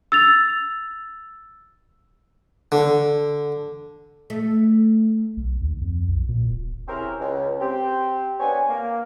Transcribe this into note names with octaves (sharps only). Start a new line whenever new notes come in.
E6 A6 F7
D3
A3
B1
D#2
F2
B1
A#2
D#1
C4 C#4 E4 G4 G#4 A#4
C#2
C4 G4
B3 C4 D4 C#5 G#5
A#3